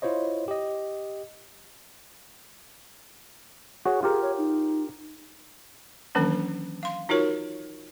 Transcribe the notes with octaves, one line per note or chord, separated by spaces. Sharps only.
E4 F4 C5 C#5 D#5
G4 D#5
F#4 G#4 C#5
F4 G4 G#4 A#4
C#5
D#4
D#3 E3 F#3 A#3 C#4 D4
F5 C6
D#4 F4 F#4 A#4 C#5